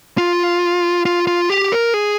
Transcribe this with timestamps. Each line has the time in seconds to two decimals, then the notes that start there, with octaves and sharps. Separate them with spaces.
0.18 F4
1.05 F4
1.27 F4
1.50 G4
1.72 A#4
1.94 G#4